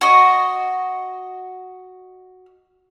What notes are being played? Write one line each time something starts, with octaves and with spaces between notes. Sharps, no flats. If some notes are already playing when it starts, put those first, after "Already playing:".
F#4 D#5